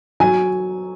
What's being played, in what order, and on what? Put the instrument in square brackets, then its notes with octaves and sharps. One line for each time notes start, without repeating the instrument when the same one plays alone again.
[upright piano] F#3 G#5